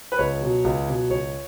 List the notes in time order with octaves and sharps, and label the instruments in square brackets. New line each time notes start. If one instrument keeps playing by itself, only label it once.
[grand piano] B4
C#2 C#5
B2 F#3
C#2
B2 F#3
C#2 C#5